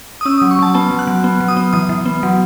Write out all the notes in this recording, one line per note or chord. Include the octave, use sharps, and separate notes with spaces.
D#6
C#4 E6
F#3 D#6
C#6
F#3 A5
B3 A5
F#3
F#6
F#3
B3
F#3
D#6
B3
E3 D#6
E3
B3
F#3